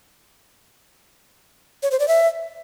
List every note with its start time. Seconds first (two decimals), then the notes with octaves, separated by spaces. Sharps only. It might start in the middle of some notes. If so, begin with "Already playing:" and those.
1.83 C#5
1.91 C5
1.99 D5
2.08 E5